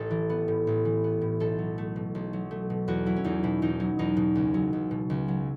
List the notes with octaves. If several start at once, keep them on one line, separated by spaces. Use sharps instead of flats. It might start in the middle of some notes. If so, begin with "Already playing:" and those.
Already playing: A1 A4
E3
B3
A2
A1
E3
B3
A2
B1 A4
F#3
A3
B2
B1
F#3
A3
B2
E2 F#4
F#3 E4
C#4
E2 D#4
B2 E4
E2 D#4
F#3
E2 D#4
B2
C#2
F#3
C#2
B2
C#2
F#3